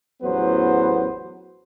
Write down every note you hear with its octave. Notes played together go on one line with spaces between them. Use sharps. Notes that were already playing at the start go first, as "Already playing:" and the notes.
A1 E2 F#3 B3 B4 C5